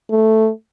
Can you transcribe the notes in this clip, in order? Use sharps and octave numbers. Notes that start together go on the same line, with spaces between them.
A3